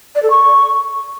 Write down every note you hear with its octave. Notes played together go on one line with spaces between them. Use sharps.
D5
A4
C#6